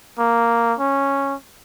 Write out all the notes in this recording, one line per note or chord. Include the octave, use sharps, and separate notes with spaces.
A#3
C#4